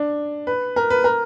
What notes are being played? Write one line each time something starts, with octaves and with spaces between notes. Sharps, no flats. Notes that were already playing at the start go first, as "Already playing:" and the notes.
Already playing: D4
B4
A#4
B4
A#4